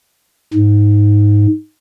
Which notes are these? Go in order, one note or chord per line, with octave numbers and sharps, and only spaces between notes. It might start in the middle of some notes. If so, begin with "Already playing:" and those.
G#2